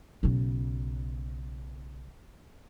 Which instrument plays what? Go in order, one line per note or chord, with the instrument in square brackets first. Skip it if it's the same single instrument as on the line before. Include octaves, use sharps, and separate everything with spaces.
[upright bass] B1 C#3